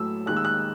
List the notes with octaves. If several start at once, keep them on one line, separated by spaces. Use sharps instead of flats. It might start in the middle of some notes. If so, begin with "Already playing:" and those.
Already playing: A2 F#3 A3 E6
D#2 D#3 G#3 F#6
E6
F#6